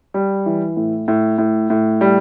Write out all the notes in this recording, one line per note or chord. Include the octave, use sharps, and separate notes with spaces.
G3
E3
A2
A2
A2
A2
G3